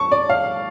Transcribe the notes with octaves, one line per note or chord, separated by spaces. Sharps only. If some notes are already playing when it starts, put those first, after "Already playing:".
Already playing: A5 C#6
D5
F5